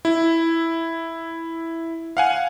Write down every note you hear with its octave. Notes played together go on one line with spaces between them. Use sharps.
E4
F5 F#5 G#5